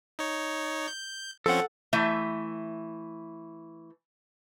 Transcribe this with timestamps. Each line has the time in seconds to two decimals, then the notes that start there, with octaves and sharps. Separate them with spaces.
0.19 D#4 C#5
0.88 G6
1.46 F3 C4 C#4 A4 F#5
1.93 E3 A3 E5